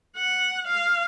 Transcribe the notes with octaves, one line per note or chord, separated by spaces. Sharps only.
F#5
F5